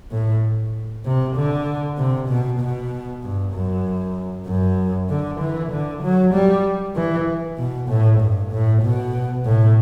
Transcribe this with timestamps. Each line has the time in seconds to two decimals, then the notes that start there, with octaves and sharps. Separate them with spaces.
0.11 A2
1.05 C3
1.36 D3
1.98 C3
2.28 B2
2.60 B2
3.23 G2
3.53 F#2
4.46 F#2
5.09 D3
5.40 E3
5.71 D3
6.02 F#3
6.33 G3
6.95 E3
7.58 B2
7.89 A2
8.20 G2
8.51 A2
8.82 B2
9.45 A2